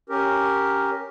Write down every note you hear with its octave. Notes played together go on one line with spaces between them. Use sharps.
C#4 G4 A#4